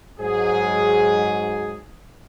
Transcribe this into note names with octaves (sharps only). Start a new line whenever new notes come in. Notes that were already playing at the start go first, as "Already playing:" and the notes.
G#2 F#3 G#4